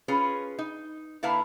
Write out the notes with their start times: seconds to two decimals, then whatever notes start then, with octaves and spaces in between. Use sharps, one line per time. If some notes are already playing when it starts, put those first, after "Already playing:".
0.08 C#4 F4 G#4 B4
0.59 D#4
1.23 D3 A#3 E4 B4 F5 A5